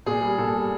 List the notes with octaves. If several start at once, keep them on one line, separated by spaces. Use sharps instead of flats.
A#2 G#4
G3
A#2 A4
G3